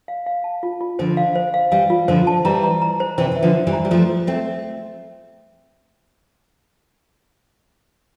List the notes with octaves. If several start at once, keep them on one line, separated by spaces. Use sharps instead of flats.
F5
F5
A5
F4
F4
D3 F3 C5
F5
C5
F5
E3 G3 F5
F4
D3 F3 C5
A5
E3 G3 A#5
A#5
A#5
C5
C3 E3 C5
E3 E5
D3 F3
C5
E3 G3
A#5
G3
F3 A3 C5
C5
A3 C4 E5